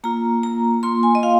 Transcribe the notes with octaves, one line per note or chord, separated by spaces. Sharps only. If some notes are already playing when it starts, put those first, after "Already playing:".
A#3 F4 A#5
A#3 F4 A#5
A#3 F4 C6
G#5
D#5
F4 F5